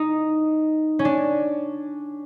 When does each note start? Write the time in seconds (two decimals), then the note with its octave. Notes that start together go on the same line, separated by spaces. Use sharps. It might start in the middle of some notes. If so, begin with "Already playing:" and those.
Already playing: D#4
0.99 C#4
1.05 D4